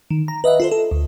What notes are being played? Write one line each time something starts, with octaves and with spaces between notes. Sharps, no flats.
D#3
A#5
B4 D#5 E5 F#5
F4 A4 C5
A4
D2